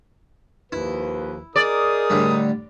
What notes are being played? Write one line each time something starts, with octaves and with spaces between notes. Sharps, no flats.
D#2 F3 E4 B4
D#4 G#4 A#4 D5 D#6
A2 D3 G3